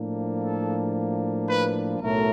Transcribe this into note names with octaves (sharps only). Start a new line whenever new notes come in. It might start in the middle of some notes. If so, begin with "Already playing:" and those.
Already playing: A2 F3 A#3 D4
A4
B4
B1 A2 F#3 A3 A#4